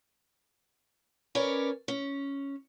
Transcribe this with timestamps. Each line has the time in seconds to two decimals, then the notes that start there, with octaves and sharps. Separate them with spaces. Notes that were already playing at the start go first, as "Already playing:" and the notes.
1.35 C#4 A#4 B4 C#5 D5
1.88 C#4